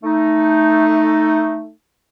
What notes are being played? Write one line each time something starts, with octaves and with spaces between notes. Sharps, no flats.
A3 D#4